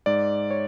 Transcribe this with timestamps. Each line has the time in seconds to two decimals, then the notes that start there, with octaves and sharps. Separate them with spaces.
0.06 G#2 D5
0.51 C#5